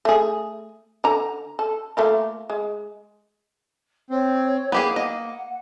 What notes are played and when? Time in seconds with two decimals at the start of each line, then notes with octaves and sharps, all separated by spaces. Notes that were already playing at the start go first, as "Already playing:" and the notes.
0.05 A3 G#4
1.04 D3 A#5
1.59 A4
1.97 A3 A#3 F4
2.50 G#3
4.10 C4 C#5
4.72 A#3 B3 G4 G#4 C5
4.96 D#5 F#5